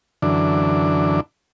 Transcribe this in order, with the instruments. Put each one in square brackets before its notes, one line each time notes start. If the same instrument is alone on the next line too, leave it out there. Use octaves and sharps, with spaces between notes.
[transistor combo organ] F#2 D3 E3 D4